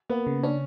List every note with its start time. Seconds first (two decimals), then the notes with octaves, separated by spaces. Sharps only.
0.09 A#3 B3
0.27 C#3
0.43 C#4 D4